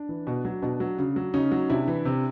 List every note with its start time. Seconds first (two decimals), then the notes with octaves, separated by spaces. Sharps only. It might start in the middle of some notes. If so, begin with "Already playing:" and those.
Already playing: D4
0.09 E3
0.27 B2
0.45 F#3
0.62 B2 D4
0.80 F#3
0.98 C#3
1.16 F#3
1.34 C#3 C#4 D#4
1.51 F#3
1.69 C3 D4 E4
1.88 E3
2.05 C3